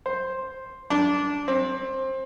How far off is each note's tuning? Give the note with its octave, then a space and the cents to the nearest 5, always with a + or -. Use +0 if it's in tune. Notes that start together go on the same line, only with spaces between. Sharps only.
C5 +5
D4 -15
C4 +20